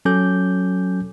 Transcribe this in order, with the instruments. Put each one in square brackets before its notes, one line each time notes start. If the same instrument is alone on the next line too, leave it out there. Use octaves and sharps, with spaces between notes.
[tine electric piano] F#3 C#4 A4 G#5 D6 G6